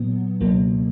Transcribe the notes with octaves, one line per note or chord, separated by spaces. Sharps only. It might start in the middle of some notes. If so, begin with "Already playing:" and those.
Already playing: A#2 F#3 B3
C#2 B2 F#3 A#3